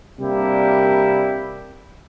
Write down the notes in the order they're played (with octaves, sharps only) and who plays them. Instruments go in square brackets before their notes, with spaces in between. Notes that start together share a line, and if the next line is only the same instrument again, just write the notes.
[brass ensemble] C3 G3 A#3 D4 E4 G4